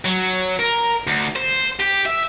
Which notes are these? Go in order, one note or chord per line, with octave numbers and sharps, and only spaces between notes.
F#3
A#4
D2
C5
G4
E5